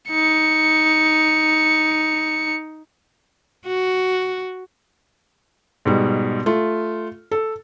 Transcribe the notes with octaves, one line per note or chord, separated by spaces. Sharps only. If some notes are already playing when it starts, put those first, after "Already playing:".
D#4 C#7
F#4
G#2 B2 G3
A3 F4
A4